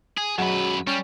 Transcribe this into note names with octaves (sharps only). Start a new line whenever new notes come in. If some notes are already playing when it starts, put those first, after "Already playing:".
G#4
F#2 F#3 G#3 B4
G3 C#4